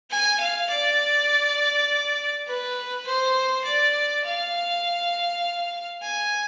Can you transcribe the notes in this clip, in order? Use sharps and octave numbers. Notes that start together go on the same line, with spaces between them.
G#5
F5
D5
B4
C5
D5
F5
G#5